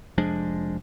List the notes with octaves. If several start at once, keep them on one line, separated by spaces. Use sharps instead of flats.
F1 F3 G#3 D4